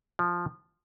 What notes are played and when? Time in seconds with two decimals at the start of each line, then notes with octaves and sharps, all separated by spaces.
0.19 F3